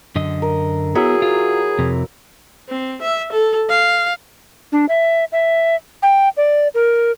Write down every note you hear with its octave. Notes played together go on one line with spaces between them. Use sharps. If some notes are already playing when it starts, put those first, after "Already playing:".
F#2 D3 D#5
A#4
F#3 B3 E4 G#4
F4
F2 C3
C4
E5
A4
F5
D4
E5
E5
G5
D5
A#4